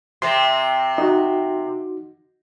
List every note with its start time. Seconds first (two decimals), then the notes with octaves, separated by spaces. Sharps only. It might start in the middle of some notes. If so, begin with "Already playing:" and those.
0.22 C3 C4 C6
0.98 D#4 F#4